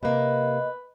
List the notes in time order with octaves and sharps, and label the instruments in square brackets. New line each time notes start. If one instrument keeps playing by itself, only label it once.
[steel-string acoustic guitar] C3 A#3 [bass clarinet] B4 [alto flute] D#5